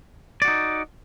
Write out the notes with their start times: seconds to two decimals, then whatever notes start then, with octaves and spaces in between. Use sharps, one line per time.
0.42 D5
0.45 F#4
0.48 D#4